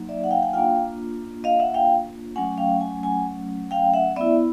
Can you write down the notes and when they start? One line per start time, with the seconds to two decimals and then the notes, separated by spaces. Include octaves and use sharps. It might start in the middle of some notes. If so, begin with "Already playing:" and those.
Already playing: F#3 A#3 D#4
0.09 D5 E5
0.24 F#5
0.31 F5 G5
0.43 F#5 G#5
0.53 A#3 D4 F4 F5 G5
1.44 D#5 F5
1.59 E5 F#5
1.74 F5 G5
2.36 F#3 A3 C#4 F#5 G#5
2.58 F5 G5
2.81 G#5
3.03 F#5 G#5
3.71 F5 G5
3.94 E5 F#5
4.16 B3 E4 D5 E5